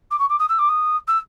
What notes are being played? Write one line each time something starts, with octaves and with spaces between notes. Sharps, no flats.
D6
C#6
D6
D#6
E6
D6
D#6
E6